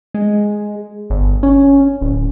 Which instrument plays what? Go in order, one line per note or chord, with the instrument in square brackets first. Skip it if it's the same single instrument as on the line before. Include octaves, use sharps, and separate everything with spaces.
[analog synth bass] G#3
G1
C#4
D1